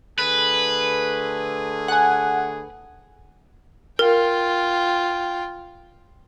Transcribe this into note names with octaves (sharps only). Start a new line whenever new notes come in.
D3 A3 G#4 B4
F#5 G#5
F4 A#4 G5